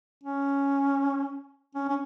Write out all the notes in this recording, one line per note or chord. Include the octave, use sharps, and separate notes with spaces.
C#4
C#4
C#4